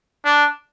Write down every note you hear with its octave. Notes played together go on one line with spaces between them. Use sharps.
D4